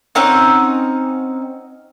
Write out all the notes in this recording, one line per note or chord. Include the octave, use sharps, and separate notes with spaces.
C4 C#4 D#4 F#5